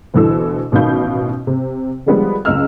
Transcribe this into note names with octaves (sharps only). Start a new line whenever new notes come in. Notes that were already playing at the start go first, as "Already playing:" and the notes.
D2 B2 E3 A4 E6
A1 B2 D#3 F5 B5 G6
C3
D3 F3 G3 G#3 B3
C#2 F#2 D#5 E6 F6